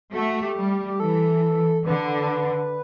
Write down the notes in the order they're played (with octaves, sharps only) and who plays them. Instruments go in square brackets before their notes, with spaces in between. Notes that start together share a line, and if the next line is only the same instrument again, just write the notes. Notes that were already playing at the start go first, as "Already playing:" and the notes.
[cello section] A3 [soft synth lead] F#4
[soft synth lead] G4
[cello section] G3
[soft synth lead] G4
G4
[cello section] E3 [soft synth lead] A4
[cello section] D3 [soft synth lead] B4